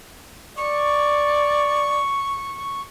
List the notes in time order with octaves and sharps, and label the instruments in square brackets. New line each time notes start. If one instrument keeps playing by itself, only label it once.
[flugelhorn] D5 [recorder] C#6